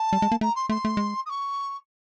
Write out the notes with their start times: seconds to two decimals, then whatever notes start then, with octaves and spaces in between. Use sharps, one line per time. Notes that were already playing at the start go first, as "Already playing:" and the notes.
Already playing: A5
0.13 G3
0.22 G#3
0.32 A#3
0.41 A3 A#5
0.55 C6
0.69 A3 C6
0.85 A3
0.97 G#3
1.25 D#6
1.29 C#6